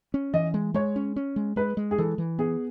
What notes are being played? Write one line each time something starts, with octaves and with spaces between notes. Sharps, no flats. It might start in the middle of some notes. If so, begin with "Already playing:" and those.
C#4
E3 D#5
G#3
G#3 C#5
C#4
C#4
G#3
G#3 B4
G#3
G#4
E3 A4
E3
B3 G#4